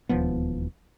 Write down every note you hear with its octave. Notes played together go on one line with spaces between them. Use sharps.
E1 D#2 F3 B3